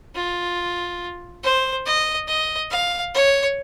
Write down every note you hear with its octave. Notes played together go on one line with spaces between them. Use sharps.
F4
C5
D#5
D#5
F5
C#5